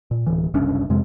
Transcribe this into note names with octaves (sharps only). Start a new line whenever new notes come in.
A#2
D1 E3
F#1 C2 C#4 D4
F2 C3 G#3